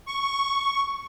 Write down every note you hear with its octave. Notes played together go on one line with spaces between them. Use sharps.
C#6